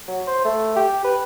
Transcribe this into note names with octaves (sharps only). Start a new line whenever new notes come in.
F#3
C5
A3
G4
B4